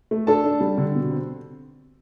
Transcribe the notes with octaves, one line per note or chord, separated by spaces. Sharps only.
A3
D4 A4 A5
D4
G3
D3
B2
C4